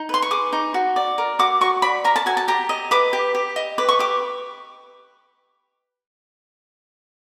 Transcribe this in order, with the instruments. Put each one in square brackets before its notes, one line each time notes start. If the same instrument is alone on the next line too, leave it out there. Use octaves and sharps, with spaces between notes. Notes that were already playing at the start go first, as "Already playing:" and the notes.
Already playing: [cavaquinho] D#4
B4 C6
C#6
G#4 D6
D#4
F#4
D5
A#4
F#4 D6
F#4 C#6
D5 B5
A#4 A#5
A5
F#4 G#5
A5
G4 A#5
D#5
B4 D6
G4
G4
D#5
B4 D6
C#6
G4 D6